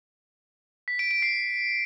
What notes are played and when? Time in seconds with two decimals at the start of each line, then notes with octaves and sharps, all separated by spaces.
0.88 B6
0.99 D7
1.11 D7
1.22 C7